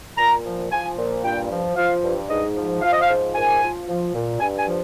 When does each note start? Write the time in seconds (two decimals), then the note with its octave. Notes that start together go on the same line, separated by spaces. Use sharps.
0.17 A#2 A#5
0.44 F3
0.70 F3 G#5
0.97 A#2
1.23 G2 G5
1.50 F3
1.76 F3 F5
2.03 G2
2.29 G#2 D#5
2.56 F3
2.82 F3 F5
2.92 D#5
3.02 F5
3.09 G#2
3.35 A#2 G#5
3.61 F3
3.87 F3
4.14 A#2
4.40 G2 G#5
4.59 G#5
4.68 F3